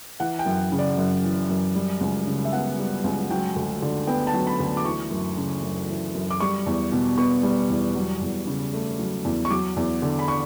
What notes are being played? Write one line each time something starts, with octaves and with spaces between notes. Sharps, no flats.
E3 F#5
G5
F#2
C#3
D5
F#2
E3
F#2
G3
C#2
C#3
E5
B3 F#5
G3
C#2
F#3 G5
D2
D3
B3 G5
A5
F#3
B5
D2
D6
E3 C#6
F#2
C#3
F#2
E3
F#2
D6
G3 C#6
E2
B2
B3 C#6
G3
E2
F#3
E2
C#3
A3
F#3
E2
C#6
F#3 D6
E2
D3
B5
C#6